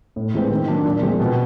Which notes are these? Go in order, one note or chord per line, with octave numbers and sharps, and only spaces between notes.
A2
E3 G#3 C4
D#3
F#3 A#3 D4 F4
A#2
F3 G#3 C4
B2